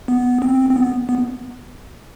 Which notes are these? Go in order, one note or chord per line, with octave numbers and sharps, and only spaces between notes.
B3
C4
C4
B3
B3